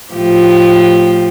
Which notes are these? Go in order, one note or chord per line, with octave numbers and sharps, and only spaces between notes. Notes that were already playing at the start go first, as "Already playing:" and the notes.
A2 F3 G4